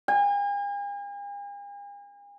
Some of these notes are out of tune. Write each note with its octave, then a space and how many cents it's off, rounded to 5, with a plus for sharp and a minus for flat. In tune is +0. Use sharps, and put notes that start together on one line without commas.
G#5 -45